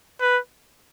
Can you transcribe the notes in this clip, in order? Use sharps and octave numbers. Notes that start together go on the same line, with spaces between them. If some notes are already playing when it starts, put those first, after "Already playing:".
B4